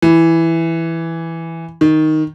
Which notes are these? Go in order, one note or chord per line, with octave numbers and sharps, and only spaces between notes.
E3
D#3